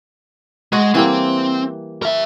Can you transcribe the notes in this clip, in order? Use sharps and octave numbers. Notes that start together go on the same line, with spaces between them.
G#3 F#4
E3 G3 A#3 C4
A#4 E5